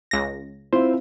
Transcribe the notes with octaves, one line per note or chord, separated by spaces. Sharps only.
C#2 A#6
C4 E4 F4 C5